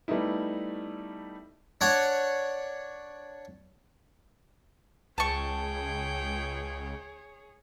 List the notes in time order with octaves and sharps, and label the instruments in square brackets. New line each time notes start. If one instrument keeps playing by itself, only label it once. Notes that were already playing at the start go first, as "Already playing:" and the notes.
[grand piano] G3 A3 B3 D#4 E4
[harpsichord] D4 C#5 F#5
[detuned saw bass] C#2 [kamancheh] G#4 C#5 [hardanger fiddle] G5 [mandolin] A5 C#6